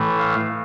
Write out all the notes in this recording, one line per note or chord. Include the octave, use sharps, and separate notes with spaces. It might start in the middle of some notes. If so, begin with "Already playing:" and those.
Already playing: A2 E3 A3
F5